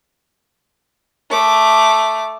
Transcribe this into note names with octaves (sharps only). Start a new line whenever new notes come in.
A3 D6